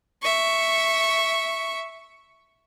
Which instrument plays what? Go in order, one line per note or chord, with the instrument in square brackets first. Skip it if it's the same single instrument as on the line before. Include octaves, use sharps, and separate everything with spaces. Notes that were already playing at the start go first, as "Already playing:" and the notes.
[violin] E5 C#6